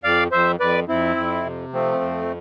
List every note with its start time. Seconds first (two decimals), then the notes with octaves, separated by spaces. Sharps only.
0.04 F2 D5 F5
0.32 F2 C5 E5
0.60 F2 B4 D5
0.88 F2 C4 E4
1.16 F2
1.45 C3
1.73 F3 A3 C4
2.01 F2